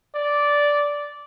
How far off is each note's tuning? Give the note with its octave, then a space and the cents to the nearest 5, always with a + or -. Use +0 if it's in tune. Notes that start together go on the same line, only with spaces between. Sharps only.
D5 -10